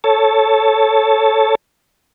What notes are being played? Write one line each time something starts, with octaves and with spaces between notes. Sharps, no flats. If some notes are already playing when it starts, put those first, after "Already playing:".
A4 C#5 A5